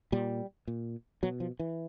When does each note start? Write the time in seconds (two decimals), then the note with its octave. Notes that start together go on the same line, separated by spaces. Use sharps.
0.12 A#2 G3
0.68 A#2
1.23 B2 F#3
1.40 F3
1.60 E3